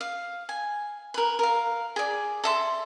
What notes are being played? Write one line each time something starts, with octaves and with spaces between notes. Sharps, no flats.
F5
G#5
A#4 B4
A#4 F5
G#4 D5
A4 E5 C6